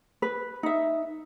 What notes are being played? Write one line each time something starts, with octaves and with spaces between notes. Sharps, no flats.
B4
D#4 E5